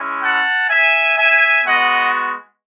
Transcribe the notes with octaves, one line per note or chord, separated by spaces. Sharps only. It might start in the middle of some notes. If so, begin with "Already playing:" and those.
Already playing: G#3 C#4 E4
F#5 A5
E5 G#5
E5 G#5
G#3 B3 F#4 D#5 F#5